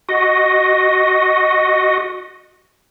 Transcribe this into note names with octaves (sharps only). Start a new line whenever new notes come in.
F#4 D#5